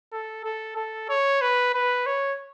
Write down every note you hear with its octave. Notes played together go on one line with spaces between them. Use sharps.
A4
A4
A4
C#5
B4
B4
C#5